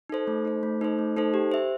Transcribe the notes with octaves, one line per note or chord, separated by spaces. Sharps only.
D#4 A4 C5
A3
D#4 A4 C5
A3
D#4 A4 C5
A3
D#4 A4 C5
G4
C5 E5